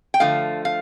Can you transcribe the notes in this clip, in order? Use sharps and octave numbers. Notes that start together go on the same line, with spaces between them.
G5
D3 F3 A3 F5
F5